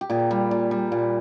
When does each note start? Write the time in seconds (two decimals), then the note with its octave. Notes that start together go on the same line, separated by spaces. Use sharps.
0.01 G4
0.10 A#2 G#4
0.31 G3
0.51 A#2
0.71 G3
0.92 A#2